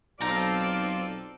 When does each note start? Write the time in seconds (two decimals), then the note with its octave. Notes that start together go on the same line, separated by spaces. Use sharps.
0.21 B1 C4 D#4 F4 A4 D5 A#5